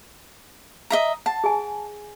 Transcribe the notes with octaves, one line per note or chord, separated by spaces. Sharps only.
D#5 E5 A#5
F#5 A5
G#4 G#5